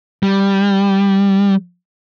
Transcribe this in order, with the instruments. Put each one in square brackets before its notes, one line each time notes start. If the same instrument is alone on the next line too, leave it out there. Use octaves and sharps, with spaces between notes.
[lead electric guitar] G3